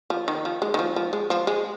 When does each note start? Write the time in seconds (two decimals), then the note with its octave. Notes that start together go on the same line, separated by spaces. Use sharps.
0.10 F3
0.28 D#3
0.45 F3
0.62 G#3
0.74 D#3
0.79 F3
0.96 F3
1.13 G#3
1.30 F3
1.47 G#3